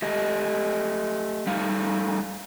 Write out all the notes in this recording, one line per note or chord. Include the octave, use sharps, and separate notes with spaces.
A3 G4 D#5
G3 A3 D#4 F5